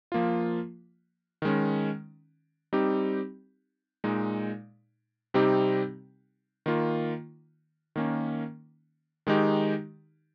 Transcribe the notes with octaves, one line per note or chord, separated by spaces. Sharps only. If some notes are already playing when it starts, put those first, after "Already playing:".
F3 A#3 F4
D#3 G#3 C#4
G3 C4 D#4 G4
A#2 G#3 D#4
C3 G3 C4 D#4 G4
D#3 A#3 F4
D#3 A#3 C#4
D#3 G#3 D#4 G4